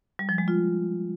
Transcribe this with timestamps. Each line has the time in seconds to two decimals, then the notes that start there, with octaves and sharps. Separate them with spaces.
0.19 G3
0.29 F3
0.38 G#3
0.48 F4